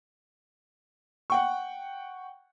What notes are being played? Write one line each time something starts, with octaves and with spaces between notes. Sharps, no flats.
F#5 G5 C#6